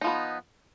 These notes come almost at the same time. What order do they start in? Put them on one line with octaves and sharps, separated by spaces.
D#4 F3 B3